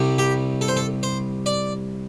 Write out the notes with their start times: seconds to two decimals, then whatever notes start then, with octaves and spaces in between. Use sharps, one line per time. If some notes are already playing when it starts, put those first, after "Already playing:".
Already playing: C2 C3 G3
0.18 G4
0.61 A4
0.68 C5
0.77 A4
1.03 C5
1.46 D5